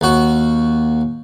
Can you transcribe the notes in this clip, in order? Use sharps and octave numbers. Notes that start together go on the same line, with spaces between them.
D#2 F#4